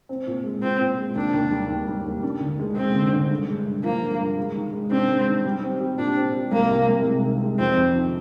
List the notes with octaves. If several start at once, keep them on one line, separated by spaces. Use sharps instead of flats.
C4
A#2
G#3
C4 F4
A#2
G#3
D#2 D4
D#2
G3
D#2
G3
D#2
D4
D3
G#3
G#3 C4
D3
D3
G2
G#3
G2
F3 A#3
G2
G2
G#3
D#3
G#3
C4 D4
G#3
D#3
G3
C4
G4
A#2 D4
C4
G4
C2 A#3
C3
C2
G#3
D#3
G#3
F2 C4
F2
D#3